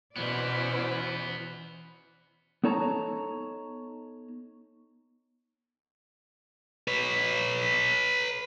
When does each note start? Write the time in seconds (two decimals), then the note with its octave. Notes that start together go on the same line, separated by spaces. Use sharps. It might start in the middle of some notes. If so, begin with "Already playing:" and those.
0.16 B2 E3 B3 C#4 E4 B4 C5 D5
2.64 B3 D#4 A4 C#5 A5 A#5
6.88 B4 C#5